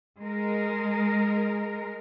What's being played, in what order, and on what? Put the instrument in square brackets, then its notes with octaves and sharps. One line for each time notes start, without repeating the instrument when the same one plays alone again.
[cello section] G#3 A#4